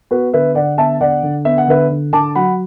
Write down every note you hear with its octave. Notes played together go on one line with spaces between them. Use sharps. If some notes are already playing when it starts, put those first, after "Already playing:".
B3 F#4 B4
D3 B4 E5
D3 D5 F#5
B3 E5 A5
D3 D5 F#5
D3
B3 E5
F#5
D3 B4 E5
D3
D3 A5 D6
F#3 F#5 B5